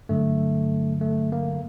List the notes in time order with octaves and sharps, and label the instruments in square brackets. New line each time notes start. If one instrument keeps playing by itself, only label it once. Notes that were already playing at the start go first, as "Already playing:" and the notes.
[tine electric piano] G2 D3 F#3 A3
A3
A#3